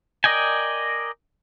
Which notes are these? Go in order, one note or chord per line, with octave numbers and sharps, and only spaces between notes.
A#4 D5 D#5 G5 G#5